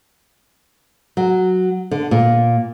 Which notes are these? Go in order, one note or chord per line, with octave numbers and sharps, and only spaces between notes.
F#3
D3
A#2